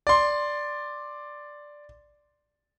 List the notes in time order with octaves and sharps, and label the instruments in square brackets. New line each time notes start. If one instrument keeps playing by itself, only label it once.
[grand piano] D5 C6